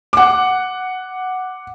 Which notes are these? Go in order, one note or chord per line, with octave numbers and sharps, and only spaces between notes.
F#5 D6